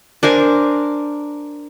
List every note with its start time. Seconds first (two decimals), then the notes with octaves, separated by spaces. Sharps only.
0.23 D4 A#4 C5 G#5